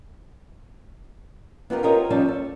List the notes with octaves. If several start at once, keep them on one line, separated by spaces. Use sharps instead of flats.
B3 D#4 F4 G4 G#4 A#4
F4 G4 A4 A#4 C#5 D#5
F3 G3 C#4 D#4 D5 A5
A4